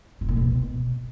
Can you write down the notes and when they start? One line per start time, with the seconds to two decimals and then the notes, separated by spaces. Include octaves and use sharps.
0.21 B2
0.29 A#2
0.37 B2